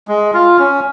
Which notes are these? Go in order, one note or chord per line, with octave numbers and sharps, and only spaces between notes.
G#3
F4
C#4